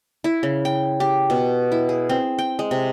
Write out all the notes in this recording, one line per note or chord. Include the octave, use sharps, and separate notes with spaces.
E4
C#3
G5
G4
B2
E4
G#4
C4
G5
G#3
C3